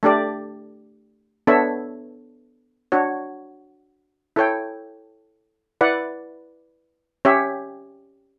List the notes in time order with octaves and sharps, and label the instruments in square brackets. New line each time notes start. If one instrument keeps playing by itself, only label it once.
[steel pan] A3 D4 G4 D5
B3 D4 A4 C#5 E5
D4 F#4 C#5
E4 A4 C#5 G5
E4 B4 D5 F#5
C#4 G4 C#5 E5